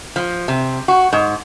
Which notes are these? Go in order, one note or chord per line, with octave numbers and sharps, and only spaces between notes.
F3
C3
F#4
G#2